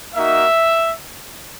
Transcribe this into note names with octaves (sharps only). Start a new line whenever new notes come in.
A#3 D#4 F#4 E5